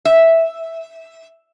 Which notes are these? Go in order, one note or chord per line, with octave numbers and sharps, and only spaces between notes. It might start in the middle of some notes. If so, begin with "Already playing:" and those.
E5